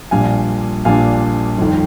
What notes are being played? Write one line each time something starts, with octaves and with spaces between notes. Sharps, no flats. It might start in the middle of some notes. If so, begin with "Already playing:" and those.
A#1 A#2 G3 D4 F5 G#5
A#1 A#2 G3 D4 F5 G#5
G1 F2 D#3